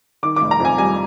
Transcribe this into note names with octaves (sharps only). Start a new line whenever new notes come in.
D#3 D6
D6
F1
A#5
F2
G#5
G3 G#5